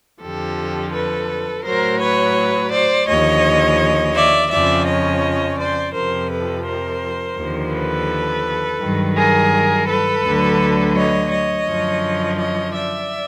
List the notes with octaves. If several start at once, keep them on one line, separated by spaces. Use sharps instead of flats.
F2 D3 F3 G4 A4
A4 B4
A2 F#3 A#4 C5
B4 C#5
C5 D5
D#2 D3 F3 C#5 D#5
D5 E5
F2 C#3 F3 D5 E5
C#5 D#5
C5 D5
F2 C3 F3 A#4 C5
A4 B4
A#4 C5
D#2 D3 F3
A4 B4
G2 D#3 F#3
G#4 A#4
A4 B4
D2 D3 F#3
C#5 D#5
C#5 D#5
F#2 D3 F3
C#5 D#5
D5 E5